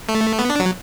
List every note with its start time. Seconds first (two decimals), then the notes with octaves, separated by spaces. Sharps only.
0.09 A3
0.39 B3
0.50 D4
0.60 F#3